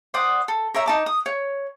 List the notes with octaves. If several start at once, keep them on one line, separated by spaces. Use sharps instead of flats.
C5 D5 F#5 D#6
A4
A#4 C#5 E5 A#5
D#4 A5 D6
D#6
C#5